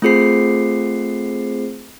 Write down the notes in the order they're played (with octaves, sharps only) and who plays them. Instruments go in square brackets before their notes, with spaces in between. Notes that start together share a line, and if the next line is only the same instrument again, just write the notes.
[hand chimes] A3 C4 F4 G#4 C5 C7